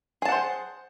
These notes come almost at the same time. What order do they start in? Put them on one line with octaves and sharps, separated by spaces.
G#4 A5 F#5 C5